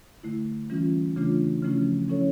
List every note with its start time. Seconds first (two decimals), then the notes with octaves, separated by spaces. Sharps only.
0.23 D3 A3 E4
0.70 E3 G3 C#4 F4
1.16 C#3 E3 A3 D4 F4
1.62 C#3 F3 A3 C#4 E4
2.09 F3 C#4 E4 A4 C#5